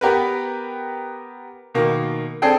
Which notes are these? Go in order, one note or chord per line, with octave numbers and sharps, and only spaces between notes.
B3 G4 A#4 B4
B2 D#3 A#3
C4 D4 G#4 A4 G5